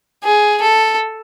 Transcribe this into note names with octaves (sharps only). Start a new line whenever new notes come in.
G#4
A4